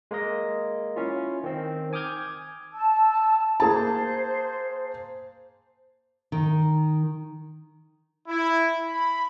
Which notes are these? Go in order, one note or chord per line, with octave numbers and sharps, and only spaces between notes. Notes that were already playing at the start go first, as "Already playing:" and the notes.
G#3 A#3 A#4 D#5
C#4 E4 F4
D#3 C4
G#5 D6 D#6 F6 G6 G#6
A5 E6
A#3 G#4 C5 A5
D#3
E4
B5